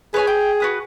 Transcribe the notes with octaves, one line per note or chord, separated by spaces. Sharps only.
G#4 B4 C#5 G#5
G5
F#4 B4 D#6